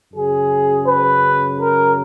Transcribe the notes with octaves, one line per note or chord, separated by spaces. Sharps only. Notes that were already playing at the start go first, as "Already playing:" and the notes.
F#2 C#3 G#4
B4
A#4